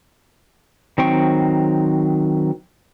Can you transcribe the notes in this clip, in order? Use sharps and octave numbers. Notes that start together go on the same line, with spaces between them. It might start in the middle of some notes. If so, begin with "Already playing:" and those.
D#3 F#3 C4 G5 C#6